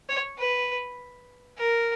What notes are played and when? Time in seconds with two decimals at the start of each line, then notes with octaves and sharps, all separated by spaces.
0.09 C#5
0.38 B4
1.58 A#4